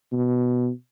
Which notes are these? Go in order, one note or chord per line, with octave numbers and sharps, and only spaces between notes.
B2